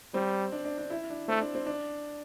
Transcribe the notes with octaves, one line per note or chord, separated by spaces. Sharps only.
G3 C4
D4
D4
D4
E4
D4
A3 C4
D4
C4
D4